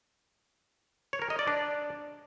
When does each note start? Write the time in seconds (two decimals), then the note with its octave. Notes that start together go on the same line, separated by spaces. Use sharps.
1.13 C#5
1.22 A#4
1.30 D#5
1.39 D5
1.48 D4